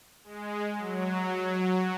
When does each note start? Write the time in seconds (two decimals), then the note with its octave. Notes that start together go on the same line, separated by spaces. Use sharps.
0.24 G#3
0.78 F#3